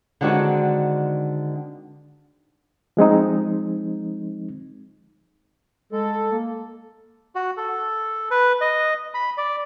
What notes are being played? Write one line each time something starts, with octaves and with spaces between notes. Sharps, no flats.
D3 D#3 G#3 C4 D4 F#4
F3 G#3 C4 D#4
G#3 A4
A#3
F#4
A4
B4
D#5
B5
D5